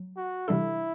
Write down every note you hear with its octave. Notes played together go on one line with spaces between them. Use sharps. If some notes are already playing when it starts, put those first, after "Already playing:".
Already playing: F#3
F#4
C3 E3 G3 D4 E4 A4